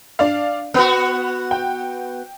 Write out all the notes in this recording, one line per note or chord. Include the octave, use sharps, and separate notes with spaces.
D4 D5 F5
B3 F#4 B4
G5